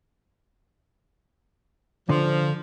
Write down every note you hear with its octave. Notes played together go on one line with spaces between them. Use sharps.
D3 F3